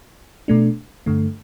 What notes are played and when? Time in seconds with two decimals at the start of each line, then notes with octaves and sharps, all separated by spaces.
0.48 B2 A3 D4
1.06 G2 D3 A3